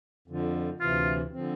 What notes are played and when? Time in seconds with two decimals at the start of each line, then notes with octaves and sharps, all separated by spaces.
0.28 F2 D3 F3
0.80 D2 C3 E3 F4
1.33 D3 F3 C4